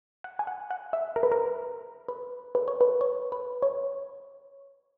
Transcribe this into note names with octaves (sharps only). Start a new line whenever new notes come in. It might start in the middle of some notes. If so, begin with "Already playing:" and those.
F#5
G#5
F#5
F#5
E5
A#4
B4
A#4
B4
B4
C#5
B4
C#5
B4
C#5